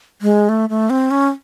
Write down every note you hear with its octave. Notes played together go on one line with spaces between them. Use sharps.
G#3
A3
A3
C4
C#4